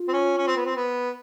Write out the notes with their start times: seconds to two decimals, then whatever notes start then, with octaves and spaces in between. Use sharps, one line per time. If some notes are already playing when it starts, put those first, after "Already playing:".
Already playing: F4
0.08 C4
0.13 C#4
0.38 C#4
0.47 C4
0.56 B3
0.65 C4
0.76 B3